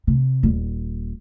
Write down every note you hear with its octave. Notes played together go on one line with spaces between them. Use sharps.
C3
D#1